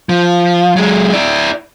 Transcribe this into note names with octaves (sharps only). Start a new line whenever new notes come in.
F3
F#3 G#3
E4 D5